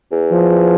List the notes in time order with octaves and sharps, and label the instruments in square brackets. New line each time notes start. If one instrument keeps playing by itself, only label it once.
[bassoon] E2
[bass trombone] F3